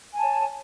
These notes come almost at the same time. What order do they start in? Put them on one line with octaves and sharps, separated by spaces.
G#5 A5 C#5